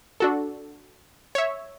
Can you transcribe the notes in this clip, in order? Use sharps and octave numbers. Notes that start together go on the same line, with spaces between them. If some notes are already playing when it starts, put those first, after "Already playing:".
D4 F#4 A4
C#5 E5